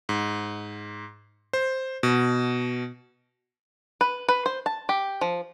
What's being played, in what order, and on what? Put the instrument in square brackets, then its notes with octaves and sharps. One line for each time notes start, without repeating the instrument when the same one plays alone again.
[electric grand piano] G#2
C5
B2
[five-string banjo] B4
B4
C5
A5
G4
F3